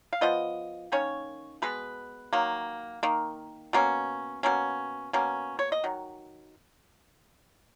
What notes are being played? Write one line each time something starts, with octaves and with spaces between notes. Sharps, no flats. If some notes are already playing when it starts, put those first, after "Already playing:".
F5
F3 B3 B4 D#5
D#3 A#3 C#4 C#5
B2 G#3 B3 B4
D#3 F#3 A#3
D#3 A#3
B2 A#3 C#4
B2 A#3 C#4
B2 A#3 C#4
C#5
D#5
D#3 F#3